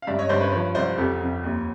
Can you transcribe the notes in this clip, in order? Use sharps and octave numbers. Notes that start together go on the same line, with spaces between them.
F5
G2 D5 E5
C#5 D#5
G2 C5 D5
B4 C#5
F3 B4 C#5
C2 C5 D5
F2 G4 A4
F2
D#2